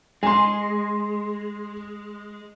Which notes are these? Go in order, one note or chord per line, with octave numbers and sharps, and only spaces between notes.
G#3 G#5 C6